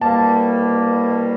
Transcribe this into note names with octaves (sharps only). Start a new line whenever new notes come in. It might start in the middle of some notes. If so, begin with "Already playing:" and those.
C2 B2 G3 A#3 A5